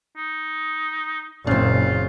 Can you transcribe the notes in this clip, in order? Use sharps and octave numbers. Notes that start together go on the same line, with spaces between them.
D#4
F#1 A#2 C#3 C4 F4